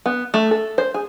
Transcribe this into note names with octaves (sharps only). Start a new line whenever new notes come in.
B3
A3
A4
C5
G#4